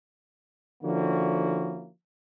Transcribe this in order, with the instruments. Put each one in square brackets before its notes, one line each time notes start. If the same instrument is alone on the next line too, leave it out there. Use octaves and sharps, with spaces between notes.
[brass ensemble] D3 F3 A#3 C#4 E4 F#4